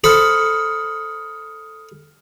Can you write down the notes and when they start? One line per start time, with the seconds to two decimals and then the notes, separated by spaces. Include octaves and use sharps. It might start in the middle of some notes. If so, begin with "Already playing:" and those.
0.04 A4 C5 B5 D#6 F6 C#7